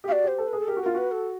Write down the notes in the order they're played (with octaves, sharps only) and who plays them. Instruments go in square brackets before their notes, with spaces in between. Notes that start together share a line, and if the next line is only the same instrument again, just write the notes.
[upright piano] G4
[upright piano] F#4 [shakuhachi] D5 F5
[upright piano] G4 [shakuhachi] C5
[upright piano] A4
[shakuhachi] B4
[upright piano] G#4
[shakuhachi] A4
[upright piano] G4 [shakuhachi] A#4
[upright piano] F#4
[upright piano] F4 [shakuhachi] A#4
[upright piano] F#4 [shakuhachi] B4
[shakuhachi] A4